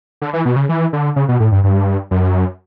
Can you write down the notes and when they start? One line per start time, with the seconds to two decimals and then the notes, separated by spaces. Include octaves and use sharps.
0.22 D3
0.33 E3
0.45 B2
0.56 C#3
0.69 E3
0.93 D3
1.16 C#3
1.28 B2
1.40 A2
1.52 G2
1.64 G2
2.11 F#2